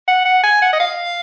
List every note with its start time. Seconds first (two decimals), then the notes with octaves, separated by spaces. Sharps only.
0.08 F#5
0.25 F#5
0.44 G#5
0.62 F#5
0.73 D#5
0.80 F5